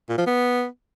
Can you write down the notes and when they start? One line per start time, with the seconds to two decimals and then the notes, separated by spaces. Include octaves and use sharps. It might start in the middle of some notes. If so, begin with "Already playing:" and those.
0.09 A#2
0.18 F3
0.27 B3